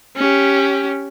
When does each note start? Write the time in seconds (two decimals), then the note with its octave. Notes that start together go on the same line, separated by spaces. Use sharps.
0.16 C#4 G4